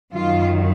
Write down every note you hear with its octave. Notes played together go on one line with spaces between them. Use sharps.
F#2 D#3 F4